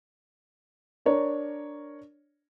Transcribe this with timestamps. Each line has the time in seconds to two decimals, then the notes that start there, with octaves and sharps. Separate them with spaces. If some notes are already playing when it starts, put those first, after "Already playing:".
1.06 D4 A#4 C#5 D5